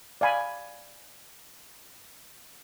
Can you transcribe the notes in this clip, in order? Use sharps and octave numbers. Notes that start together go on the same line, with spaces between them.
D5 F5 G#5 B5